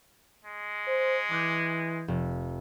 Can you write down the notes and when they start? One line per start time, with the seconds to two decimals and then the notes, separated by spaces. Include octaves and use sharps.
0.45 G#3
0.87 C5
1.31 E3 D6 F#6 G6
2.08 F1